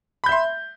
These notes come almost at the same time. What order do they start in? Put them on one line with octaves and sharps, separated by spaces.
B5 G6 E5 C6